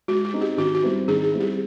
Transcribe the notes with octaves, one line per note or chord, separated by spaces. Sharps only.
G#3 F#4
F#4
C4 D#4 G#4
G4
D#3 F#4
F#4
G3 C4 E4
D#3 G#4
G#4
G3 C4 E4
G4